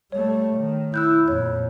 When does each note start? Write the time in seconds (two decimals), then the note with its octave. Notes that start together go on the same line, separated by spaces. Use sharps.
0.12 G3 A3 C#5
0.54 D#3
0.94 E4 E6 F#6 G6
1.28 F2 A#2 C#5